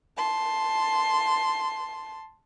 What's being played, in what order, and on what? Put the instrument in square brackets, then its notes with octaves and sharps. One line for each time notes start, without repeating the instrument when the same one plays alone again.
[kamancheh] A5 C6